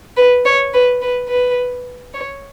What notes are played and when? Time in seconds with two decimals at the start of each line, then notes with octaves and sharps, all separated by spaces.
0.16 B4
0.45 C#5
0.74 B4
1.02 B4
1.29 B4
2.14 C#5